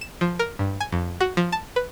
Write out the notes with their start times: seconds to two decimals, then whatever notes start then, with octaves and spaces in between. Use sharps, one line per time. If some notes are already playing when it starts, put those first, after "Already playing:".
0.01 E7
0.21 F3
0.39 A#4
0.59 G2
0.80 G#5
0.92 F2
1.21 F#4
1.37 F3
1.52 A5
1.76 B4